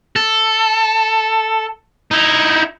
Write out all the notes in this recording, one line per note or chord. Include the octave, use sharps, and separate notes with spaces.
A4
D#4 E4